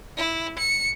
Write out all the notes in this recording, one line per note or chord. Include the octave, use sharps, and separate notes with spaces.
E4
C#7